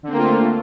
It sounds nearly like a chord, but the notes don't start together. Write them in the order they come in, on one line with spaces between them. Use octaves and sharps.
D3 C4 A#3 F4 A3